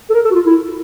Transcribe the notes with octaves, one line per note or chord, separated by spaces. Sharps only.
A4
A#4
A4
F#4
F4
E4